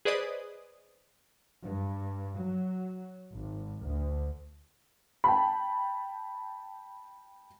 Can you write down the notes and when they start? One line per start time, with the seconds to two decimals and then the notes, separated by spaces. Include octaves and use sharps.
0.05 G#4 B4 C5 D5 D#5 D#6
1.63 G2
2.37 F#3
3.33 G#1
3.83 D2
5.24 G5 A5 B5